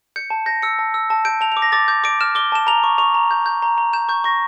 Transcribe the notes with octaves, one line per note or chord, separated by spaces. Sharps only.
G6 C#7
A5
G6 A#6
E6 C#7
A5
E6
A5
G6 D7
A5 F7
F7
D6
A#6
D6 A6
D6 G6
D6 D7
F6 E7
D6 G7
A5 E7
A#5 F7
C#6
C#6 F7
A#5
G6
G6
A#5
A#5
G6 E7
C#6 G6
C#6 A#6